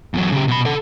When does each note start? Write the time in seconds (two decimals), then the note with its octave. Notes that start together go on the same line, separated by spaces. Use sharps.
0.14 E2 F#3
0.32 C#3 G4
0.48 B2 B5
0.66 A4 F#5